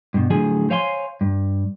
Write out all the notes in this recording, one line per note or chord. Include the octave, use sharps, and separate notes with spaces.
G2 B2
A2 D3 F3 F#3 G#4 G#5
C5 C#5 F5 G#5 A5 C6
G2